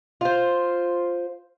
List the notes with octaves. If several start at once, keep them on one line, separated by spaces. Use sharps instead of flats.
F4 C5